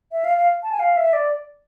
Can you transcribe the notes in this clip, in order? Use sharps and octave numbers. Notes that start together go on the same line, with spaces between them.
E5
F5
F5
A5
G#5
F5
E5
D5